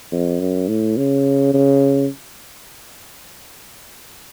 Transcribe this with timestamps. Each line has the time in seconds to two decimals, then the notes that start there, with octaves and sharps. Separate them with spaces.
0.12 F2
0.40 F#2
0.68 A2
0.97 C#3
1.54 C#3